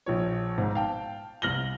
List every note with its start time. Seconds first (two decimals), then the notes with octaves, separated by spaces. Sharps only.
0.06 A#1 F3 C#5
0.58 G#1 G#2
0.75 F5 G5 A5
1.42 C2 F6 A#6 F#7 G7